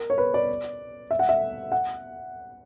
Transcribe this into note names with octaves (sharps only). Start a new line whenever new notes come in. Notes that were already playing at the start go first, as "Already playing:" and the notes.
Already playing: A#4
C#5
B4
D5
E5
F#5
E5
F#5